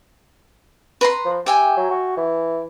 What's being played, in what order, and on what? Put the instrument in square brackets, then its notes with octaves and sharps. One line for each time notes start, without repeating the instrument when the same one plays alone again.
[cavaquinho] B4 A#5 C6
[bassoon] F3
[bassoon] G4 [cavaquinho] E5 G5 G#5
[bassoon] F#3
F#4
E3